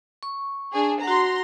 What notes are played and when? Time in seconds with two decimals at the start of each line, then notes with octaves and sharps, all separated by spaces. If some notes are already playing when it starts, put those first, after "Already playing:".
0.23 C#6
0.73 D4 G#4
1.03 F#4 F#5 A#5 C6